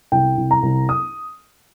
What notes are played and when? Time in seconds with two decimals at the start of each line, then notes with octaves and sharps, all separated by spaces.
0.12 C2 G5
0.37 C2
0.51 A#5
0.63 C2
0.89 D#6